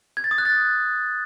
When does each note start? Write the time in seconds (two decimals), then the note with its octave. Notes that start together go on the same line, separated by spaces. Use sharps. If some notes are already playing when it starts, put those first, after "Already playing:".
0.17 G#6
0.24 A6
0.31 D#6
0.38 F#6
0.45 A6